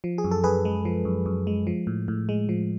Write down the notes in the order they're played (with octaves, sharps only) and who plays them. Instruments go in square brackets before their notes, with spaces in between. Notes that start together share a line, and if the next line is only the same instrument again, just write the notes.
[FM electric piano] F3
G#4
F#2
A4
F#2 G#4 B4
G#3
F3
F#2
F#2
G#3
F3
A2
A2
G#3
F3